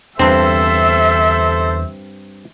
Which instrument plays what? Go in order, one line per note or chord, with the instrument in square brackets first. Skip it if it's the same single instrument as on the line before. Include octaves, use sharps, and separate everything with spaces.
[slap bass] E2 D3 [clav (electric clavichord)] G2 C4 [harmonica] A4 C5 [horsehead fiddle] E5